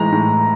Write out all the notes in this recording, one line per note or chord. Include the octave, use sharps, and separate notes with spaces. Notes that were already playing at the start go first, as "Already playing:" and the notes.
Already playing: A2 E3 G#3 A#5
A2